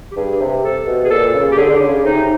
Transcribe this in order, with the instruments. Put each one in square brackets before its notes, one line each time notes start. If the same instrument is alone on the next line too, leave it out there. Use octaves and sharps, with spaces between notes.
[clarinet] G4
[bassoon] G2 [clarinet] G#4
[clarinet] G#4
[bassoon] C3 [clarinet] G4
[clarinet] A4
[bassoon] B2
[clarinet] G#4
[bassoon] A#2 [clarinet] A4
[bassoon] C#3
[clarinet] G4
[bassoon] D3 [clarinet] G#4
[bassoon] D3
C#3
[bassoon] C3 [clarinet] D#4